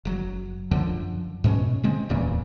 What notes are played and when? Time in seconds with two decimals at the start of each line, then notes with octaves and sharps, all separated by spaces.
0.05 F#1 F#3
0.71 F#2 D3 F3
1.44 G#2 B2 B3 C#4
1.83 D3 G#3 C4
2.09 D1 E2 A#2 C#3